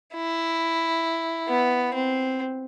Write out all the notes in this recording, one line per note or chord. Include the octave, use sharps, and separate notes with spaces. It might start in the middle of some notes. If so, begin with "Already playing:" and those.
E4
B3
C4